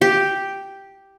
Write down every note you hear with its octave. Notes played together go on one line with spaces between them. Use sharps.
G4